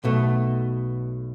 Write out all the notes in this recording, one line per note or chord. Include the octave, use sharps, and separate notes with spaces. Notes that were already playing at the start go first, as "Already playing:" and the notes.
B1 B2 A3